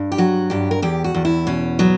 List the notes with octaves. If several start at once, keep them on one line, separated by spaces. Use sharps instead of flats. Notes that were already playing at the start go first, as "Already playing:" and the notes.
Already playing: G2
G4
F#3 F#4
G2 G4
A#4
E2 G4
F#4
E2
E4
B2 C#4
F#3 B3